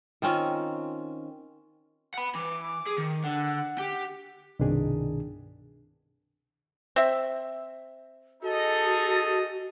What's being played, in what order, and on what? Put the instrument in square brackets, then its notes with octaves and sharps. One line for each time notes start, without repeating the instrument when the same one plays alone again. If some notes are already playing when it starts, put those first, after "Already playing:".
[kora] D#3 C4 C#4 F4
[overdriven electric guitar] F#5 B5
[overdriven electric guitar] E3 [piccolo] D6
[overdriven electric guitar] G#4
D#3
[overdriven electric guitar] D3 [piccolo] F#5
[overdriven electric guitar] G4
[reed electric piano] C2 G2 B2 D#3 D4 G#4
[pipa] C4 E5
[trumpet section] D#4 G#4 D#5 [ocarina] F#4 [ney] A4